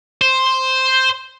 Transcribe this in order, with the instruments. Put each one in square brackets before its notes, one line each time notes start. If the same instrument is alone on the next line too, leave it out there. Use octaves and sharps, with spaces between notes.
[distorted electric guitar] C5